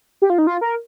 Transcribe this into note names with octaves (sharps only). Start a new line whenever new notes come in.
G4
F4
D#4
F4
A#4